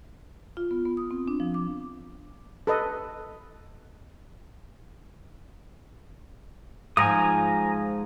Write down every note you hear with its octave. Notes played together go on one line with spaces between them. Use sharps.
F4
B3
B3
D#6
C4
D4
F3
D6
A4 B4 D#5
G#2 F3 G#5 A#5 D#6